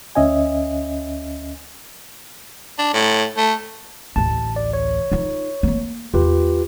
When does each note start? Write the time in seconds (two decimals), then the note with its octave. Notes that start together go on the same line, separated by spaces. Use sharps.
0.15 D2 C#4 D#5 E5 G#5
2.79 D4
2.94 A2
3.37 A3
4.16 A1 D2 A5
4.56 D5
4.73 C#5
5.12 D#4 F4
5.63 A3 A#3
6.14 E2 F4 G4 B4